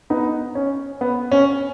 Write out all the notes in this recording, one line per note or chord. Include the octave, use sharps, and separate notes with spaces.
B3 D#4
C#4
B3
C#4